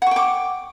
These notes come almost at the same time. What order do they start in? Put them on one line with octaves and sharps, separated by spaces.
F#5 C#6 G5 D6